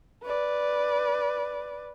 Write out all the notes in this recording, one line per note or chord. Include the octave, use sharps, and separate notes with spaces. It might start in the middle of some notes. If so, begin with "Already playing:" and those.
B4 D5